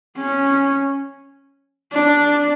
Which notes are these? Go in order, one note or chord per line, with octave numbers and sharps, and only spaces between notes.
C#4
D4